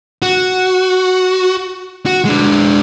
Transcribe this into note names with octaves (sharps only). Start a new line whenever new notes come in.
F#4
F#4
G#3 D4